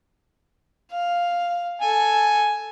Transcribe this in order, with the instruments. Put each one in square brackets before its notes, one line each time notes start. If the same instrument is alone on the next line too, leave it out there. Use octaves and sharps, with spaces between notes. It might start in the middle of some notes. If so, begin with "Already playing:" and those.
[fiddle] F5
[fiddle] A4 [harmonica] G#5